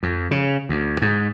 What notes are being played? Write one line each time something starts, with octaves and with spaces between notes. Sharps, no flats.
F2
C#3
D2
G#2